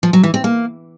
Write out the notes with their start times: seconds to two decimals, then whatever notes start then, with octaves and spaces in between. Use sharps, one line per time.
0.03 F3
0.13 F#3
0.23 E3
0.34 C4
0.44 A#3